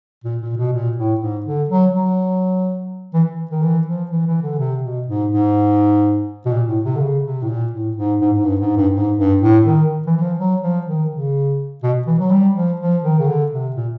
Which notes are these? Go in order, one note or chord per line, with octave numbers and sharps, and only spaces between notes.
A#2
A#2
B2
A#2
A2
G#2
D3
F#3
F#3
E3
D#3
E3
F3
E3
E3
D3
C3
B2
G#2
G#2
B2
A#2
A2
C3
D3
C#3
C3
A2
A#2
A2
G#2
G#2
G#2
G2
G#2
G2
G#2
G2
A2
D#3
E3
E3
F3
F#3
F3
D#3
C#3
B2
E3
F#3
G3
F3
F3
D#3
C#3
D3
C3
A#2